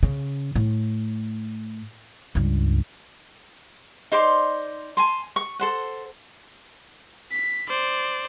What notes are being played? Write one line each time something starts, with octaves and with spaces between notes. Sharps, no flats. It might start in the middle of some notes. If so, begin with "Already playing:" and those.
C#3
A2
C#2 G2
D#4 C5 D5 C6
G#5 A5 C6
C#6
A4 C5 F#5
B6
C5 D5